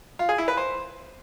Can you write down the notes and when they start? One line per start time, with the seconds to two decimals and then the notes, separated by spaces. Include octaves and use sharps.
0.19 F4
0.29 G#4
0.38 E4
0.48 B4
0.57 C5